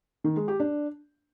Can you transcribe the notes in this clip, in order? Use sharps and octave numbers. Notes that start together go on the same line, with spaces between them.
D#3
G#3
G4
D4